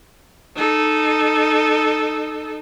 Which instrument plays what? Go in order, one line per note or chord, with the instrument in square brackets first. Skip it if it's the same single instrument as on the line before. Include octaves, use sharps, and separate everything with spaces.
[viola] D#4 A4